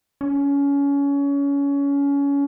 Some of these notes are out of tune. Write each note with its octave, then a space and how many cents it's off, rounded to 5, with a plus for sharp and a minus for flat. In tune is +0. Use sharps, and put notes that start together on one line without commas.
C#4 +25